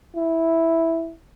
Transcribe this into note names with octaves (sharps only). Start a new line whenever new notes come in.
E4